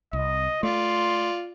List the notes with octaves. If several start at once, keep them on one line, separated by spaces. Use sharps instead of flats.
C2 D#5
A3 F4 D5 C6